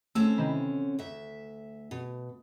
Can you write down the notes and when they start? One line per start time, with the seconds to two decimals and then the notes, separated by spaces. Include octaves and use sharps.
0.15 D3 A3 C4 C#4
0.38 C3 D#3 E3
0.99 D2 E5
1.91 B2